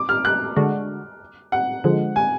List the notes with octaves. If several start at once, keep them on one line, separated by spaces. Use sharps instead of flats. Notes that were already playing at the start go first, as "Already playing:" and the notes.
Already playing: D6
F6
F#6
D3 G#3 D4 F#4
F#5
D3 F3 G#3
G#5